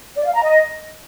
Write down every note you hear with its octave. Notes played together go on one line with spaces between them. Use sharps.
D5
F5
A#5
D#5